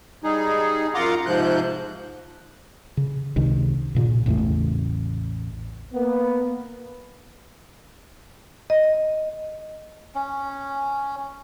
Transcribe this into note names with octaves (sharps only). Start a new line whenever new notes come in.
G3 D#4 G#4
F#2 F4 F#5 A#5 C6 D6
G#2 C3 F3 F#6 G6
C#3
C#2 C3 D#3
G2 A#2 C#3
A1 E2 C#3 A3
A#3 B3
D#5
C#4